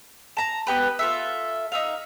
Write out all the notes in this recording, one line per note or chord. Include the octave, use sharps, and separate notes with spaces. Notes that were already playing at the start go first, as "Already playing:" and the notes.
A5 A#5
B3 G4 B4
F4 A4 E5
D#4 E5 F5